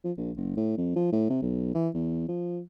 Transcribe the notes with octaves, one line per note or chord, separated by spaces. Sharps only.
F3
A#1
F#1
A2
F2
F3
A2
C3
B1
E3
E2
F3